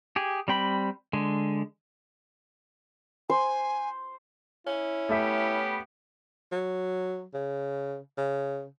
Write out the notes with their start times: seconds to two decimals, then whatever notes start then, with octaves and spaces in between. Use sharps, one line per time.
0.16 G4 G#4
0.48 G3 C4 G5 B5
1.13 D3 G#3
3.30 C5 G#5
4.67 C#4 E4
5.09 A3 B3 G4 E5 B5
6.52 F#3
7.34 C#3
8.18 C#3